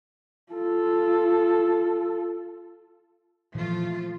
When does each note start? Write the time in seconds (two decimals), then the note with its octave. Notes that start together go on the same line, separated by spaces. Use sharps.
0.53 F4 A4
3.55 A#2 E3 F3 A3 F4